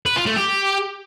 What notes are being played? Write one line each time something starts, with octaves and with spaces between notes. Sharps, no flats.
B4
F4
A3
G4